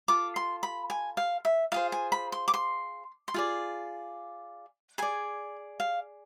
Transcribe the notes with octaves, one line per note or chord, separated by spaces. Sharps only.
F4 A4 D6
C6
B5
G#5
F5
E5
F4 G#4 C5 F5
G#5
B5
C6
D6
C6
C6
F4 G#4 D5
G#4 D5 G#5
F5